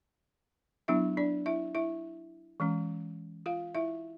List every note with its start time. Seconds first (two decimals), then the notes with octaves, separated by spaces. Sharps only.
0.88 F#3 B3 D4 E4 E5
1.17 D4 D5
1.46 E4 E5
1.75 E4 E5
2.60 E3 G#3 C#4
3.46 F4 F5
3.75 E4 E5